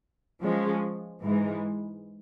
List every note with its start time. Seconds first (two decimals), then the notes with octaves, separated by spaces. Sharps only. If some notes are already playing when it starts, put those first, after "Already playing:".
0.41 F3 G#3 C#4
1.22 G#2 E3 G#3